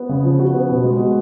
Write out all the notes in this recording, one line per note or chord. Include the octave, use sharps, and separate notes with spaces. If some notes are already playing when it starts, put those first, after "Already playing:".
Already playing: B3
C#3
F3
F#4
B3
B2
G#3
F#4